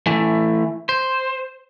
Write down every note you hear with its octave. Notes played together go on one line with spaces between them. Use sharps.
E3 A3
C5